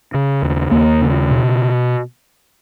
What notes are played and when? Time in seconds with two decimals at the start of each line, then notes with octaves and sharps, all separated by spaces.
0.14 C#3
0.42 D#2
0.71 D#2 A#3
1.02 C#3
1.30 B2